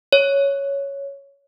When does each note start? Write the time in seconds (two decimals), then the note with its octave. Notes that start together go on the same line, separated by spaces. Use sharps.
0.13 C#5